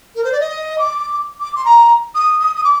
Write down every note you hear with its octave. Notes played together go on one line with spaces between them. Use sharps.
A#4
C5
D5
D#5
D6
D6
C6
A#5
D#6
D#6
D#6
D6